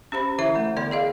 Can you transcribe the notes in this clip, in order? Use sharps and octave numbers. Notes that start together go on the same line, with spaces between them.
C#4 G4 C5 B5
D3 E3 E4 E5 A#5
A3
D3 B3 D5 G5 C6
G#4 D#5 F5